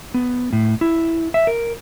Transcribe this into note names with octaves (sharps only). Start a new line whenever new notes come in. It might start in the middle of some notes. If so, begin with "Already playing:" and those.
B3
A2
E4
E5
A#4